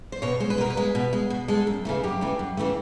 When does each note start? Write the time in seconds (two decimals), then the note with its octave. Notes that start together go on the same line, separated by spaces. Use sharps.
0.12 C5
0.22 B2 C#5
0.40 G#3 C5
0.50 B4
0.58 B2 A#4
0.70 B4
0.77 G#3
0.95 B2
1.13 G#3
1.30 B2
1.48 G#3 A4
1.67 F#2
1.85 C#3 E3 A3
2.03 F#2 G4
2.21 C#3 E3 A3
2.39 F#2
2.57 C#3 E3 A3